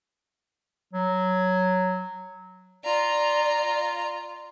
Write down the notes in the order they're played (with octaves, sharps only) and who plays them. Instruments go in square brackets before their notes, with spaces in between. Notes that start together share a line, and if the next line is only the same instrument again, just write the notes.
[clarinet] F#3
[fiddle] F4 A#5 [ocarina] D5